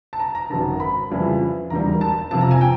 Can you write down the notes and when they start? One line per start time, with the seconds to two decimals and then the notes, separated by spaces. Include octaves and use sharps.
0.13 A5
0.20 A#5
0.35 A#5
0.50 G#1 F#2 D#3 A5
0.80 B5
1.10 F2 C#3 E3 G3
1.70 E1 D#2 D#3 G3 A#5
2.01 A5
2.31 F2 C3 F3 A5
2.41 A#5
2.51 G#5
2.61 G5